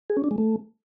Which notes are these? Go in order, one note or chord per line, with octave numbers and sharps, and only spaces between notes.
G#4
C#4
D4
G#3
A3